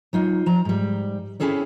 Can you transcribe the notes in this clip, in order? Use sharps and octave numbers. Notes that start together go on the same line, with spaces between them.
F#3 D#4 F4
F3 A#5
G#2 G3
C4 C#4 E4 G#4 A4 C#5